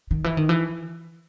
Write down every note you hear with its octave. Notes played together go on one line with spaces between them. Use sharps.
D#3
E3
D#3
E3